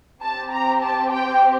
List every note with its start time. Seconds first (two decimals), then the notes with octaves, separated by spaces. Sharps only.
0.22 C4 G4 A5
0.52 A#5
0.82 A5
1.11 G5